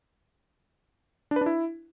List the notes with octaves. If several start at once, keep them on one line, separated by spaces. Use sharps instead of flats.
D4
B4
D4
E4